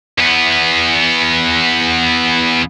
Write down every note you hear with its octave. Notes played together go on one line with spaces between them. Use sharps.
E2 B3